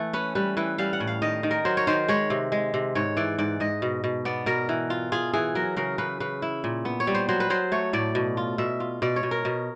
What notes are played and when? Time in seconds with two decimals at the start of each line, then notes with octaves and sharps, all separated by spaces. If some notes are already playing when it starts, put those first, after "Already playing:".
Already playing: E3 A3 E4
0.13 C#4 B4
0.35 G3 B4
0.57 E3 B4
0.78 G3 F5
0.93 F#5
1.00 A2
1.07 F5
1.22 D#3 D#5
1.43 D#3
1.51 A#4
1.65 F#3 C5
1.77 C#5
1.87 D#3 C5
2.08 G#3 C#5
2.30 C3
2.52 G#3
2.74 C3
2.95 G#2 C#5
3.17 E3 D5
3.38 G#2 D5
3.60 G#2 D#5
3.82 B2
4.04 B2
4.25 B3 D5
4.46 B2 A#4
4.69 E3
4.90 F4
5.12 F4 G#4
5.33 E3 G#4
5.55 F#3 A#4
5.76 C#3 A#4
5.98 C#3 B4
6.20 C#3 B4
6.42 E4
6.64 A#2
6.85 B3
7.00 C#5
7.07 G3
7.15 C5
7.29 F#3 C5
7.40 B4
7.50 F#3 C5
7.72 A3 C#5
7.93 A2 D5
8.15 B2
8.37 F4
8.58 B2 E5
8.80 F4
9.02 B2 D5
9.16 C#5
9.23 B2
9.31 A#4
9.45 B2